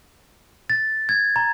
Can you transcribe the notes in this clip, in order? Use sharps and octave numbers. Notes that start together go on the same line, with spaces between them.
A6
G#6
A#5